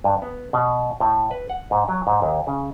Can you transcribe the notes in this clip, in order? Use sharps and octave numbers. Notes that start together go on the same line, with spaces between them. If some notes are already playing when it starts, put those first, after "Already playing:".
G2
B3
B2
A2
B4
F#5
G#2
F#3
G#2
D#2
C#3